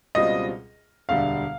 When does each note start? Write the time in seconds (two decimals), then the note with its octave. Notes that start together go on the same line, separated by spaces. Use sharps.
0.15 C#2 B2 G3 C4 F4 D#5
1.09 E1 D2 D3 G3 F5